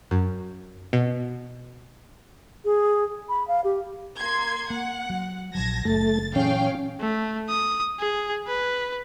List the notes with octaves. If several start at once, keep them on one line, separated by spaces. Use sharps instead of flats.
F#2
B2
G#4
B5
F5
G4
A#3 C6 G#6
A#3 F#5
F#3
A#1 F3 F#3 A5 G#6 A#6
F#1 A3 A6
A#2 E3 F#3 C#4 G#4 F5 G5
A3
D#6
G#4
B4